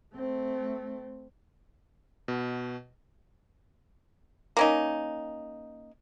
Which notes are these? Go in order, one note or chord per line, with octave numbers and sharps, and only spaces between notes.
A3 C4
B2
A#3 C#4 D#4